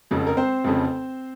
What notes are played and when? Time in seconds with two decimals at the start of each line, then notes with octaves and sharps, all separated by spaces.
0.11 F1 F2 C#3
0.27 A#4
0.37 C4 C5
0.64 F1 F2 C#3